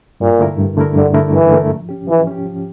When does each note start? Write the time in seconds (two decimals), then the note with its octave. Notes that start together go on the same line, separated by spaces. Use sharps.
0.20 G2 A#2
0.39 D3 A3 E4 A#4
0.58 G2
0.77 D3 A3 E4 A#4
0.95 G2 D3
1.14 D3 A3 E4 A#4
1.33 G2 E3
1.52 D3 A3 E4 A#4
1.70 F3
1.89 C#4 G4
2.08 E3 F3
2.27 C#4 G4
2.46 F3